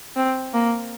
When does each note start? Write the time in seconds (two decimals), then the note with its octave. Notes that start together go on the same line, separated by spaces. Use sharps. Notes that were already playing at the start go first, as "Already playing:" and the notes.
0.16 C4
0.54 A#3